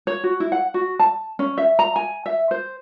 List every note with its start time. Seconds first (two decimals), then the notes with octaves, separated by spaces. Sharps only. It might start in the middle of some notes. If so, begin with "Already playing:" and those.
0.07 C#5
0.24 F#4
0.40 E4
0.52 F#5
0.74 F#4
0.99 A5
1.39 C#4
1.58 E5
1.79 A#5
1.96 G#5
2.26 E5
2.51 C5